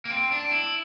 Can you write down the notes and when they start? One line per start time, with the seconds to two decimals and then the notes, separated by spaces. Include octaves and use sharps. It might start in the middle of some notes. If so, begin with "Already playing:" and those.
0.05 A#3
0.10 C4
0.32 D4
0.51 E4